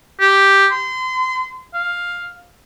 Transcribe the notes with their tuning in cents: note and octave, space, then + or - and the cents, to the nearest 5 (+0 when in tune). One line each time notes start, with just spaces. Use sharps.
G4 +0
C6 -30
F5 +5